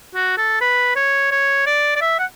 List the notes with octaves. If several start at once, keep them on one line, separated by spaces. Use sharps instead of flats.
F#4
A4
B4
C#5
C#5
D5
D5
E5
F#5